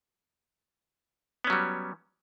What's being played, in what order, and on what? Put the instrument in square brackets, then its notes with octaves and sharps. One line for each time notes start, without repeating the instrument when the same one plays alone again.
[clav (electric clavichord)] B3
C#4
F#3
G3